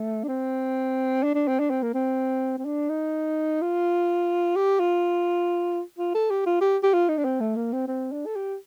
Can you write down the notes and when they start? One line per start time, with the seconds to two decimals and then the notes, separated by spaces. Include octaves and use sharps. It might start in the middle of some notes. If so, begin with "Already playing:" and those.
Already playing: A3
0.24 D4
0.28 C4
1.23 D4
1.35 D4
1.48 C4
1.59 D4
1.70 C4
1.82 A#3
1.94 C4
2.58 C4
2.65 D4
2.89 D#4
3.61 F4
4.56 G4
4.80 F4
5.98 F4
6.15 A4
6.30 G4
6.46 F4
6.61 G4
6.83 G4
6.93 F4
7.09 D#4
7.17 D4
7.25 C4
7.40 A3
7.56 A#3
7.73 C4
7.87 C4
8.12 D4
8.26 A4
8.36 G4